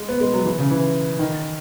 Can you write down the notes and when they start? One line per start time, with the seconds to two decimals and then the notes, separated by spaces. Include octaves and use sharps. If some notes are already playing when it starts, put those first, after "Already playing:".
Already playing: G#3
0.08 B3
0.21 G#3
0.34 F#3
0.45 E3
0.59 C#3
0.71 E3
1.19 D#3